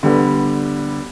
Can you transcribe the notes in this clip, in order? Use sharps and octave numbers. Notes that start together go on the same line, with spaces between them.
D3 G3 B3